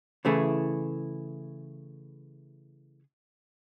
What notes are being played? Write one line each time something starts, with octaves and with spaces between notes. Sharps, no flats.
C#3 E3 A3 E4 G#4